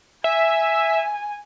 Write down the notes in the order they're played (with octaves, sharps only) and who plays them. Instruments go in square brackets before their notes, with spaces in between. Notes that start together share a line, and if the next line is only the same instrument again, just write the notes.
[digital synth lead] E5 [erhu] G#5